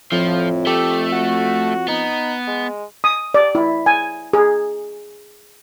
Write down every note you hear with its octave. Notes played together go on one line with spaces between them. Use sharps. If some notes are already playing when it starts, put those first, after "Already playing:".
F2 A2 F3
A3 G4
F#4
B3 D#4
G#3
D#6
D5
E4
G#5
G#4